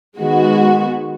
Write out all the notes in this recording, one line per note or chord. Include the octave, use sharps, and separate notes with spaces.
D#3 G#3 B3 F#4